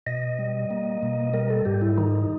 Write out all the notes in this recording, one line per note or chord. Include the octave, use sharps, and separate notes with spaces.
B2 D#5
G3
A#3
B2
G3 A#4
A4
G#2 G4
E4
D#3 D#4